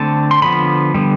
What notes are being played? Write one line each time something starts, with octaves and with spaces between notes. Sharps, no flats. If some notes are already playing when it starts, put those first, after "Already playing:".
Already playing: D3 A3 C4 A5
C6
D3 F3 B3 B5
D3 G3 B3